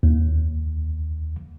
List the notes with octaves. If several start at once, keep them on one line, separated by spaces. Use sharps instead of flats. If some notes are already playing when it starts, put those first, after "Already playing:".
D#2